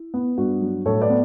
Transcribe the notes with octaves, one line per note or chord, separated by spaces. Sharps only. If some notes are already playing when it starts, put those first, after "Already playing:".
Already playing: E4
B3
G2 F#4
F#3
A2 A4 C#5
B4 D5
B3